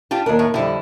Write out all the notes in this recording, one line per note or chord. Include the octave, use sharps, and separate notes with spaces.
D4 F4 G4 A5
D#2 D4 A#4
A2
F2 D3 G3 E4